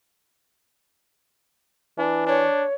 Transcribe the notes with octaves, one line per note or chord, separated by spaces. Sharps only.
E3 D4
D4 C#5